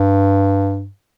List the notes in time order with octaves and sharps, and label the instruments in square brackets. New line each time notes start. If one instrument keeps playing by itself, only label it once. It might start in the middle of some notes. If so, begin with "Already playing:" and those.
Already playing: [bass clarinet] G2